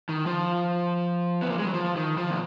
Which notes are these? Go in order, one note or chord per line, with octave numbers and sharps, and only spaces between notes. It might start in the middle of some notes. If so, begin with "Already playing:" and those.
D#3
F3
B3
A#3
G#3
F#3
F3
D#3
F3
B2